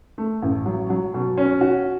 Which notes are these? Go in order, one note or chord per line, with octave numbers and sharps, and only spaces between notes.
A3
A1
F#3
F#3
B2
C#4
F#4